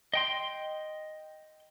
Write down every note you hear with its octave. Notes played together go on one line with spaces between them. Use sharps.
D#5 G5 C6